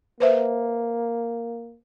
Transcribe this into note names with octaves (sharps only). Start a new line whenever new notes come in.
A#3 B4 C5 E5